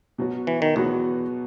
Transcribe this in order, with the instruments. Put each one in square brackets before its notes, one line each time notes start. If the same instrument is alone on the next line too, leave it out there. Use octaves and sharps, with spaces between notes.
[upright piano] B2 F#3 B3 F#4
[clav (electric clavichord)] E3
D#3
[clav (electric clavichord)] E2 [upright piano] B2 F#3 B3 F#4